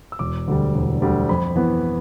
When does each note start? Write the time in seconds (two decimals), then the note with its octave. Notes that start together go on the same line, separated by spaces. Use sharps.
0.12 E6
0.19 E1 D6
0.48 D2 D3 G3
0.75 E1
1.02 D2 D3 G3
1.29 F2 B5
1.56 E3 B3